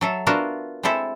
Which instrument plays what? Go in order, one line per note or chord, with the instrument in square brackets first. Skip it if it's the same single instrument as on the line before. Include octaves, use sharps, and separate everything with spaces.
[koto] F#3 A4 E5
B3 D4 F4 F#4 A#4 E5
G#3 C4 E4 A4 E5